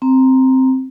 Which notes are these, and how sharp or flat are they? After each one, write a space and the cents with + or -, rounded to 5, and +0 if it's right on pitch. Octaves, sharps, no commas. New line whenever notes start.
C4 +0 A#5 +0